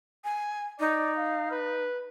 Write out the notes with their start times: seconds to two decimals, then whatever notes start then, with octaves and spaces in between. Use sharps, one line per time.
0.24 G#5
0.80 D#4 D5
1.17 F5
1.51 B4